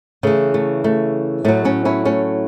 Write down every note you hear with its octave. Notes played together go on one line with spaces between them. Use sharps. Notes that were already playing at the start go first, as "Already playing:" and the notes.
C#3 E3 A3
A3
A3
A2 F#3 A3
A3 C#4
C#4 E4
A3 C#4